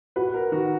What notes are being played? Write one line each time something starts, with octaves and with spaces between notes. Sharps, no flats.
F#4 B4
A#4
D#3 F#4